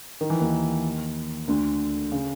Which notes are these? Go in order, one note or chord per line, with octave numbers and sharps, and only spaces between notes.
D#3
E3
D#2 D#3
D2 D3
C#3